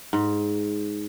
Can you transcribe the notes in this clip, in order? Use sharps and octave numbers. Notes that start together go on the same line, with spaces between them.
G#2